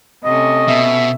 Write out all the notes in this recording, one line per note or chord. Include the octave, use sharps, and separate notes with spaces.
C3 A3 C#4 D#5
B2 E5